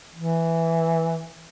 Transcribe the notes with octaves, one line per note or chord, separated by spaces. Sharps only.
E3